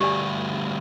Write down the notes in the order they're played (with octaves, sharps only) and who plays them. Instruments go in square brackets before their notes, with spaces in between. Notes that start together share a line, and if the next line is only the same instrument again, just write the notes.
[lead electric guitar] D2 G2 [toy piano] G4 D5 G#5